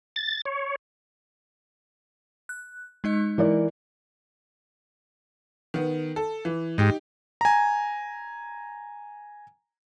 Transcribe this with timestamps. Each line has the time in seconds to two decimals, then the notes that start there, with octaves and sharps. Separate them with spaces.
0.16 A6
0.46 C#5
2.49 F#6
3.04 G#3 D#4 D#5
3.38 E3 A#4 D5
5.74 D#3 B3
6.16 A4
6.45 E3
6.78 G#2 D#4 G4
7.41 G#5 A#5